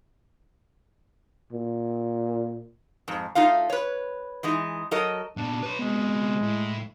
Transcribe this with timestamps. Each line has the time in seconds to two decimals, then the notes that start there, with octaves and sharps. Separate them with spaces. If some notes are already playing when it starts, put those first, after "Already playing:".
1.53 A#2
3.08 F2 G#2
3.35 A3 D#4 F4 F5
3.70 B4 C#5
4.43 E3 G#3 D#4
4.91 F#3 A4 A#4 D#5
5.37 A#2 B3 D4
5.63 B4 C#5
5.79 C3 G#3 B3
6.42 A2